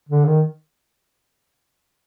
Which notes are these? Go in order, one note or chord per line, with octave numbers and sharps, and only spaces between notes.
D3
D#3